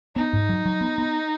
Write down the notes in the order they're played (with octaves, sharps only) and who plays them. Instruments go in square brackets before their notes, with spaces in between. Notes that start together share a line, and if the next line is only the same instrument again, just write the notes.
[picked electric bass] B3 [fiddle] D#4
[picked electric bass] G#2
F#3
F#3
B3
B3